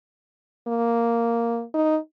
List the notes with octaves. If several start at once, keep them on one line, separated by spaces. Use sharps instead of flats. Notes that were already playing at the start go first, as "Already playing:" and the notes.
A#3
D#4